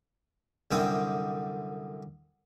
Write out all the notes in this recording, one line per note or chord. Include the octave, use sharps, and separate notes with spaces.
C2 F#2 D3 C4 D#6